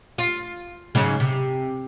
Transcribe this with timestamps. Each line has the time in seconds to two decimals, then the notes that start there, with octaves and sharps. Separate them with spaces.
0.18 F4
0.95 G#2 C#3 F#3
1.20 C3